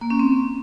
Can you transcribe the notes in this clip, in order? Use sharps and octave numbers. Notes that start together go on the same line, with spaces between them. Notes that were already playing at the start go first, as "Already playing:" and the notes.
A#3
C#4
C4